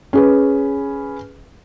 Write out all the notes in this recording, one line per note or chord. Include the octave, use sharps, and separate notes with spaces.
C#4 G#4 B4